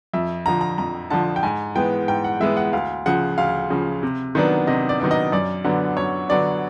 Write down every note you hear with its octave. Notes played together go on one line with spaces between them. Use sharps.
F2 E5
D3 F3 A#5
A#5
F2 A#5
D3 F3 A5
G5
G#2 G#5
E3 G#3 B3 G5
G#2 G5
F#5
E3 G#3 B3 E5
F#5
D2 F5
C#3 F3 F#5
D2 F5
C#3 F3
C3
D#3 F#3 B3 D4
C3 D#5
D5
D#3 F#3 B3 D4
D#5
F#2 D5
D3 F#3 B3 D4
F#2 C#5
D3 F#3 B3 D4 D5